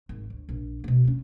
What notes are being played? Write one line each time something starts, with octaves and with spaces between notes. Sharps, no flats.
G#1
D2
A#1
B2 A3
C#4 F4